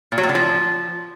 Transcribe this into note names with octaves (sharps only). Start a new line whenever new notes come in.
A#2
F#3
A2
D3
F3